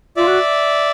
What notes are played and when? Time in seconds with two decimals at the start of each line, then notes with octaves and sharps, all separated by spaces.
0.16 F4 D5 E5
0.27 F#4